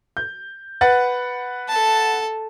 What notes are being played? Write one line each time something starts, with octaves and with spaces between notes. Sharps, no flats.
G6
B4 F#5 A6
A4 A5